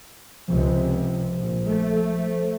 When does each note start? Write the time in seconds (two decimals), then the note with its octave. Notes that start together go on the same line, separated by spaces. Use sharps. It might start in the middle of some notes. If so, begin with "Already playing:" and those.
0.48 C#2 C3 F3
1.38 A#1
1.67 A3